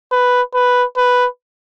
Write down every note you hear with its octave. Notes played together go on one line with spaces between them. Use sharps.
B4
B4
B4